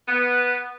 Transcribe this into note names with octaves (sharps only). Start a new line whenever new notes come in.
B3